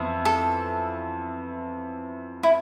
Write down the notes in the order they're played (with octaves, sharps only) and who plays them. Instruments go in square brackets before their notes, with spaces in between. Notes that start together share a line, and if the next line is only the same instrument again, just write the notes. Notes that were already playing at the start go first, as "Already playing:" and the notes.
Already playing: [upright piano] F2 E3 B3 E4
[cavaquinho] A4
E4